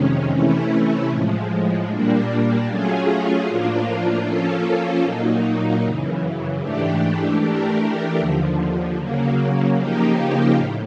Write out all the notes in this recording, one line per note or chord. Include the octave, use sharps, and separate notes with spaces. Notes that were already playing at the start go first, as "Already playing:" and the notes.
Already playing: F2 C3 D#3 G#3 C#4
C3 E3 A3 C#4 E4
A2 F3 G#3
A#2 G3 A#3 D4
F#3 A3 C#4 F4 G#4
A2 F3 A#3 D4 F4
F3 A#3 C#4 F4 A4
A#2 F#3 A#3 D#4
F#2 C#3 E3
G#2 E3 A3 D4 G4
E3 A3 D4 G4 A#4
D#2 D3 F3
C#3 F#3 A#3
C#3 F3 A#3 D#4 G4
A2